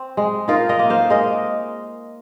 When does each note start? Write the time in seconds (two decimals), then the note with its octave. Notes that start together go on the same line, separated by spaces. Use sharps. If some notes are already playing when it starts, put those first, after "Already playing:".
Already playing: C4
0.17 G#3
0.48 D#4 F4 A#4
0.69 A#4 D#5
0.79 A#3
0.90 C5 F5
1.10 G#3 A#4 D#5